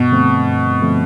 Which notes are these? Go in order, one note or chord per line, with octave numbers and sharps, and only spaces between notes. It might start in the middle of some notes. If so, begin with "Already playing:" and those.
Already playing: G2 B2
D3 F3 A3 C4
G2
D3 F3 A3 C4